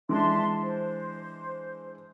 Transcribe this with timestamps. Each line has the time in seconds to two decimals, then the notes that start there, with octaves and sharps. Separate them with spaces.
0.09 E3 G#3 D4 E5 A5 C6
0.62 C5